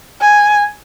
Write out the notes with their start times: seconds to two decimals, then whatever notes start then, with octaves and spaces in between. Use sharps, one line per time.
0.21 G#5